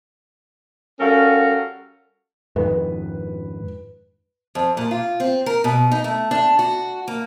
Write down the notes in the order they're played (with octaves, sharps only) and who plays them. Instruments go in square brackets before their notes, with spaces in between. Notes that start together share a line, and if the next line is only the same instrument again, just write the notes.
[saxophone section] G3 C#4 F#4 A4 A#4 F5
[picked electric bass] F2 G#2 D#3 [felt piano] B4
[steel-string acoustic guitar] F2
A#2
F4
C4
A#4
B2
D#4
A3
D4
F#4
A#3